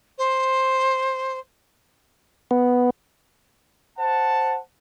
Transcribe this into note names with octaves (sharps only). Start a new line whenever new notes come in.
C5
B3
C5 F#5 A5